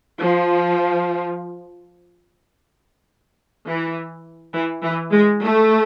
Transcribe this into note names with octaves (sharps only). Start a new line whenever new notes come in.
F3
E3
E3
E3
G#3
A3